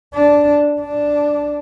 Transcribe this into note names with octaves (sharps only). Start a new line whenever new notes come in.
D4
D4